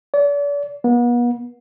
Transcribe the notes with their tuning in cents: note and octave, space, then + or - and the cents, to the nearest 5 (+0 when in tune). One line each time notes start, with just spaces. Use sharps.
D5 -40
B3 -40